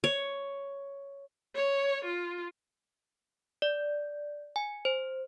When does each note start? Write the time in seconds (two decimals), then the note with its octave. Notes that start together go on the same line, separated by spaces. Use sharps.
0.04 C#5
1.55 C#5
2.05 F4
3.62 D5
4.56 G#5
4.85 C5